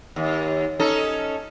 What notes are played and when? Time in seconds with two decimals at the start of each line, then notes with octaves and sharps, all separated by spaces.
0.16 D#2
0.80 C#4 D#4 A4